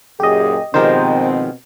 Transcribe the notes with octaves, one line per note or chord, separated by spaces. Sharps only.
F#2 A#2 G4 G#4 D#5
B2 D#3 F3 G#3 C4 G4 A#4 C5